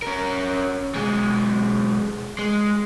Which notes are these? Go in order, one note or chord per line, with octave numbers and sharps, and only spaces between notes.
C#4 A#4
B1 G#3
G#3